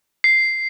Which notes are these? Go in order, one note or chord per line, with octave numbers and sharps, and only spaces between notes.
C7